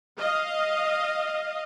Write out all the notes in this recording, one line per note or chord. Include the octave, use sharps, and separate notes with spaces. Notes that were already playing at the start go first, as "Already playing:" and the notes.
D#5 F5